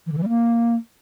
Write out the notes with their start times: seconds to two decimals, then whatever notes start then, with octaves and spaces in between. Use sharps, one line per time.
0.06 E3
0.12 D3
0.18 E3
0.23 G3
0.29 A#3